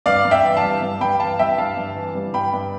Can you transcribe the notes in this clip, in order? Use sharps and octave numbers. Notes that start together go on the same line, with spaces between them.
G2 D5 F5
G2
E5 G5
E3
F5 A5
G3
G2
G2 G5 B5
E3 F5 A5
G3 E5 G5
G2 F5 A5
G2
E3
G3
G2 G5 B5
G2